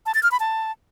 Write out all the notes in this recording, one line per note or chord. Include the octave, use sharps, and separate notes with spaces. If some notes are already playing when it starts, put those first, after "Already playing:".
A5
A6
F6
B5
A5